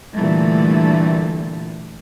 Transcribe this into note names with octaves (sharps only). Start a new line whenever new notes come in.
A#2 D3 E3 G3 A3